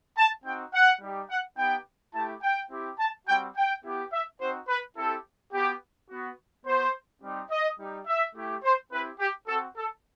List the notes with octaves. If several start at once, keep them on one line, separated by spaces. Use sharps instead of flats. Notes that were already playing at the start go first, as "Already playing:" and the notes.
A5
C4 D#4 F#4 G5
F#5
G3 D#4 G4
F#5
B3 D#4 G4 G5
A3 E4 G4 A5
G5
C4 E4 G4
A5
G3 C4 F#4 G5
G5
B3 E4 G4
E5
C4 D#4 F#4 C5
B4
C4 E4 G4 A4
B3 F#4 G4
B3 F#4
B3 F#4 C5
G3 C4 D#4 G4
D#5
G3 D#4 G4
E5
A3 E4 G4
C5
C4 E4 G4 B4
G4
C4 F#4 A4
A4